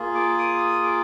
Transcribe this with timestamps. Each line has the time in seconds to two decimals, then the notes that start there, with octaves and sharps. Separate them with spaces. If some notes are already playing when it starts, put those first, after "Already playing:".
Already playing: A#3 F4 G#4
0.15 D6
0.38 D#6
0.83 D6